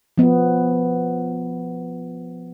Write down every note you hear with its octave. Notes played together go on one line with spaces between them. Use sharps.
F3 B3